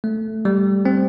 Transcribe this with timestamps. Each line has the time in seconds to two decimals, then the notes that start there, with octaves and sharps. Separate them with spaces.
0.04 A3
0.45 G3
0.85 C4